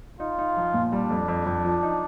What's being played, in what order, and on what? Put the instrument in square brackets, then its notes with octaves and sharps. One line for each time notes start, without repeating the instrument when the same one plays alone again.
[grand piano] D#4 [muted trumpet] F4
[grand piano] D#4
F3
A#2
[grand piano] G3 [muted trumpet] D4
[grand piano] F2
F2
F2
F3
D#4